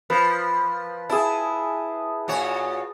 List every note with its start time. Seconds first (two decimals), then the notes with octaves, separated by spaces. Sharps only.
0.10 F3 B4
1.10 E4 G#4 A5
2.28 A#2 F#4 C#5